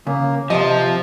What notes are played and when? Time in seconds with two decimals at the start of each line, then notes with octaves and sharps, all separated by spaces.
0.07 C#3 A#3
0.50 C3 F3 D#5 A5